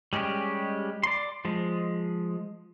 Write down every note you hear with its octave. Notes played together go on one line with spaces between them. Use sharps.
G3 G#3 C#4 G4
D5 C6
F3 G#3